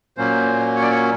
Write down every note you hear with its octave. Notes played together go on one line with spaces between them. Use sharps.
A#2 F#3 A#3 C#4 C5
C#5
D5
C#5